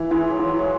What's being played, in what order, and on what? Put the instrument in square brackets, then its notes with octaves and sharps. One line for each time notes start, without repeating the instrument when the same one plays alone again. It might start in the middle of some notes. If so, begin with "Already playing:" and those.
Already playing: [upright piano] E3 E4
[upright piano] E3 [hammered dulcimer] G#3
[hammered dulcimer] F#3
[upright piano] E3
[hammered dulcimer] F#3
G#3